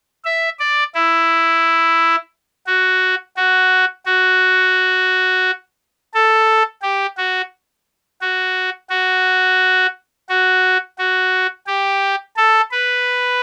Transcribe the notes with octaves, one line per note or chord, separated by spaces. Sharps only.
E5
D5
E4
F#4
F#4
F#4
A4
G4
F#4
F#4
F#4
F#4
F#4
G4
A4
B4